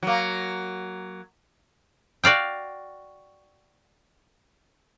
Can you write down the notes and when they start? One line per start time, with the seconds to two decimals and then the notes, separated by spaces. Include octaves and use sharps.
0.03 F#3 A#3
2.24 F#4 D5 F5 G5